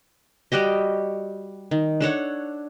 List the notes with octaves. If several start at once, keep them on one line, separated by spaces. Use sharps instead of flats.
G3 F#4 G4 D#5
D#3
D4 A4 C#5 F#5